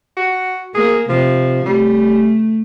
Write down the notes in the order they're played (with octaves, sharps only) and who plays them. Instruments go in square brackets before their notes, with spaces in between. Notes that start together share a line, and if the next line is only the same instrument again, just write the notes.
[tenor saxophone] F#4
[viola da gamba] A#3 [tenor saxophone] G#4
[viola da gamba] C3 [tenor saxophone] F3
[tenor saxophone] G3 [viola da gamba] A3